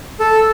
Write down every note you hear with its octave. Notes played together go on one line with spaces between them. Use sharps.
A4